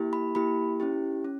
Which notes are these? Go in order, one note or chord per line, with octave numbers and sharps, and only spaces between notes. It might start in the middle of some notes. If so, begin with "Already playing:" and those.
Already playing: A#3 E4 G4
B5
A#3 E4 G4 B5
C#4 E4 G4
C#4